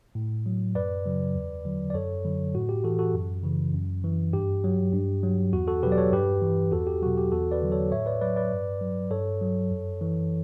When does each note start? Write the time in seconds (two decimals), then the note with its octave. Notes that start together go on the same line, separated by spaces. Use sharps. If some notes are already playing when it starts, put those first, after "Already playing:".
0.15 A2
0.46 F#3
0.75 F#2 B4 D5
1.06 C#3 F#3
1.35 E2
1.65 D3 F#3
1.90 D5
1.94 F#2 A4 C#5
2.25 D3 F#3
2.55 A2 F#4
2.69 G4
2.84 E3 F#4 A4
2.99 F#4 A4
3.14 F#2
3.44 C#3 E3
3.73 F#2
4.04 E3
4.33 G2 G4
4.64 F#3
4.93 G2
5.23 F#3
5.53 E2 F#4
5.68 F#4 A4
5.83 B2 F#3 G4 B4
5.92 D5
5.98 A4 C#5
6.12 G2 G4 B4
6.42 E3
6.72 E2 F#4 A4
6.87 G4
7.02 B2 F#3 F#4
7.17 G4
7.32 E2 F#4 A4
7.52 B4 D5
7.62 D3 F#3
7.72 A4 C#5
7.91 A2 C#5 E5
8.06 B4 D5
8.21 F#3 B4 D5
8.36 B4 D5
8.51 G2
8.81 F#3
9.10 G2 A4 C#5
9.41 F#3
9.71 F#2
10.01 E3